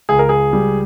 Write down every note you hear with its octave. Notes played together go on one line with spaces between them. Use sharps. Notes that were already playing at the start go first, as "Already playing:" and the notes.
C#2 G#4
A#4
G#4
G3